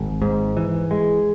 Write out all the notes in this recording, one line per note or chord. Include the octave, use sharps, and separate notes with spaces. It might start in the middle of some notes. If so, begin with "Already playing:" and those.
Already playing: G#1
G#2
E3
G#3